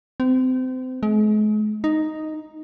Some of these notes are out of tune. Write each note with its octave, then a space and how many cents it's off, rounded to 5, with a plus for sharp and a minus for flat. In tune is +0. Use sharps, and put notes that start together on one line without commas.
C4 -30
G#3 +40
D#4 +0